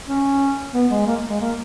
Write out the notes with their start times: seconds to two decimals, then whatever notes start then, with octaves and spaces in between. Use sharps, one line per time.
0.08 C#4
0.73 B3
0.91 G#3
1.07 A#3
1.29 G#3
1.41 A#3